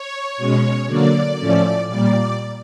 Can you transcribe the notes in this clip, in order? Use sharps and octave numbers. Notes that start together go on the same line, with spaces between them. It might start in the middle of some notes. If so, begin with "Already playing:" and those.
Already playing: C#5
B2 G#3 C#4
D3 F#3 A#3 D5
A2 F3 A3 C#4
A#2 G3 A#3 D5